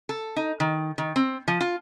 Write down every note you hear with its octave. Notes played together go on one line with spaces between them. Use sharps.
A4
D#4
D#3
D#3
C4
F3
F4